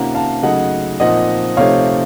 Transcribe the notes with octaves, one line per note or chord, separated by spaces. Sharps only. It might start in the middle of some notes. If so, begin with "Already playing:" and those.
Already playing: C3 D#3 A#3 C#4 F4 F#5 A#5
F5 A5
C#3 F#3 A3 D#4 D#5 F#5
A#2 F3 C4 D#4 D#5 F#5
C3 F3 A3 C4 D#4 C#5 F5